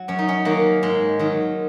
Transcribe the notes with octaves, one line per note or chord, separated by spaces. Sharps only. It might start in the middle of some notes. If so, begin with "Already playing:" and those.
Already playing: F#3 F#4
F#2 C#4
D#4
C#4
D#3 F#3 A#3
G#2 G#3
D#3 F#3